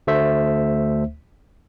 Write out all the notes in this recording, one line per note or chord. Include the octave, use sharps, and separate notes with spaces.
D2 A3 C5 E5